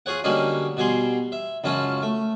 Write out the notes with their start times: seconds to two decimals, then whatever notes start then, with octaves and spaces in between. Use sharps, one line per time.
0.06 F4 G#4 C#5 F#5
0.24 D3 F#3 G3 A#3 C#4 D#4
0.77 B2 G3 G#4 C6
1.32 E5
1.64 C#2 F#2 C#4 F4 A5 B5
2.02 A3